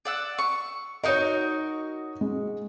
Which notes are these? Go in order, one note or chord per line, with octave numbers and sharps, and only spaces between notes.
D5 F#5 E6
C#6
D#4 F#4 A#4 C#5 D#5
G#3